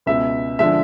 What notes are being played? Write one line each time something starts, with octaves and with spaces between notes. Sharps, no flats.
C#2 B2 G#3 E5
D3 F3 G#3 E5